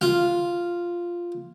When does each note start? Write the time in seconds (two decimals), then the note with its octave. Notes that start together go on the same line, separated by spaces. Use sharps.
0.01 F4